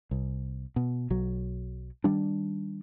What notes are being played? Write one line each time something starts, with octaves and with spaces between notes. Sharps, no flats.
C2
B2
B1 F#3
D#3 G3 D4